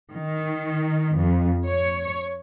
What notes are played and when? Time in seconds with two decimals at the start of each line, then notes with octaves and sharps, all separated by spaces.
0.11 D#3
1.16 F2
1.67 C#5